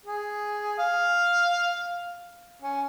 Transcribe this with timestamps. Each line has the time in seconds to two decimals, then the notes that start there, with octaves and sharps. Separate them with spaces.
0.06 G#4
0.79 F5
2.62 C#4